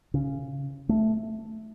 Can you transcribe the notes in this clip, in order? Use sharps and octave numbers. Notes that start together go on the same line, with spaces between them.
C#3
A3